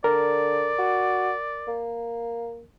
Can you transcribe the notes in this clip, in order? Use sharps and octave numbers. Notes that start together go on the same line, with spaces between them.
D3 A#4 D5
F#4
A#3